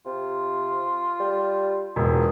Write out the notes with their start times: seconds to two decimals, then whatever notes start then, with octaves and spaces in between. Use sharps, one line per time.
0.06 C3 F4
1.20 G3
1.96 E1 A#2 D#5